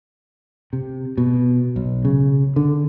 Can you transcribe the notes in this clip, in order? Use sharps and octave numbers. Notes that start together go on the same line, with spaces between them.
C3
B2
B1
C#3
D3